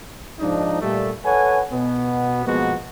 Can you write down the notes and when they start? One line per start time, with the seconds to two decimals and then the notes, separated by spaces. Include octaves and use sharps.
0.39 G#2 F3 D4 D#4
0.81 A#2 G3 A3
1.24 A4 B4 C#5 F#5 G#5
1.72 B2 B3
2.45 B2 F3 G#3 A#3 B3 F#4